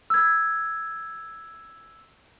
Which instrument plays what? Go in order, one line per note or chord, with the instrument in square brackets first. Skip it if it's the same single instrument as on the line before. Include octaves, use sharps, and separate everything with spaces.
[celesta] E6 G#6